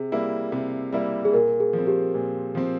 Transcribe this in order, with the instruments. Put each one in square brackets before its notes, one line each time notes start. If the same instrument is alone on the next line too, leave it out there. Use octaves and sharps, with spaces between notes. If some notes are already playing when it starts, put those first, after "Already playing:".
Already playing: [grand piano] C3 [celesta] G#4
[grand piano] G3 A#3 E4
C3
G3 A#3 E4
[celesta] G#4
[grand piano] A#2 [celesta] A#4
[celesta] G#4
[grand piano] F3
C4
[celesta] G4
[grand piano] A#2
F3 C4